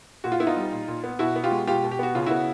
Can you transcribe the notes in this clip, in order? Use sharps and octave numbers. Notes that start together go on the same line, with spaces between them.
A#2 F#4
F4
B3 E4
D#4 F4
G3
A#2
A#2
B3
B2 E4 F#4
B3
F4 G4
G#3
B2 F4 G4
B2
G4
B3 F#4
C#3 F4
B3 E4 F#4